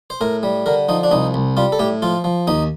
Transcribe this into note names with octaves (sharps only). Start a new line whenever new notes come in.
C5
A2 A#4
G3
D3 A#4
F3 D#4
D4
C2 D#4
C2
G3 F4
A4
A2 G4
F3 F4
F3
D#2 D#4